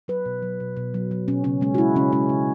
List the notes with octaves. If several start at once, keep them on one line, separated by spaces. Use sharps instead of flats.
F#3 B4
B2
F#3
B2
B2
F#3
F#3
B2 C#4
C#3 C#4
G#3 C#4
F#4
G#3 E4
C#3 C#4
G#3 C#4
C#3